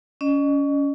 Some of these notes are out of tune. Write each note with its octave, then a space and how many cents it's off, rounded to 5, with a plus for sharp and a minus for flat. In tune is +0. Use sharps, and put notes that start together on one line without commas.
C#4 +25 D#5 -35